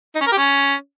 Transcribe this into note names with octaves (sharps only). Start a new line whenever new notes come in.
D#4
C#4
A#4
G4
C#4